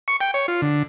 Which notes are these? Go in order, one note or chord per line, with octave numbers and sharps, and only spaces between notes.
C#6
G5
C#5
F4
D3